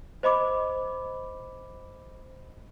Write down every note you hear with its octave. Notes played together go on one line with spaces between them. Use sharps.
C5 D#5 B5 D6